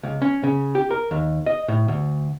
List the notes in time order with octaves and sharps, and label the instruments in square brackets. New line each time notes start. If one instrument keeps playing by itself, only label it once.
[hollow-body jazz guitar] C#2
C#4
C#3
G4
A#4
D#2
D#5
A2
D2